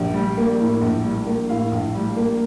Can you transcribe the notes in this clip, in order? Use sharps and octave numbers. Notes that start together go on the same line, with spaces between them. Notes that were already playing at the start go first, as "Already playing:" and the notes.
Already playing: A#1 G4
G3
A#3
A2
A#1
G3
A#3
A2 F5
A#1
G3
A#3